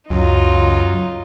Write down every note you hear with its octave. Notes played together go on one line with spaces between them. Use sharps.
C#2 F#2 F#3 D#4 F4